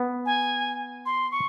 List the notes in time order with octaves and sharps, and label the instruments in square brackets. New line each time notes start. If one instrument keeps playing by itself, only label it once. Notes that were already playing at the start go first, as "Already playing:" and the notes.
Already playing: [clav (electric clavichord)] B3
[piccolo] G#5
C6
C#6